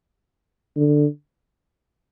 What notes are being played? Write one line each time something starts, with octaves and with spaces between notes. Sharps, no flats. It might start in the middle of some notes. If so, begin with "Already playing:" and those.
D3